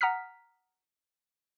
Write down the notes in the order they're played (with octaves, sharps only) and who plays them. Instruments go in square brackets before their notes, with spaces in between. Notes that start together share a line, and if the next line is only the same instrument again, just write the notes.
[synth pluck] F#5 A#5 D#6 F6 B6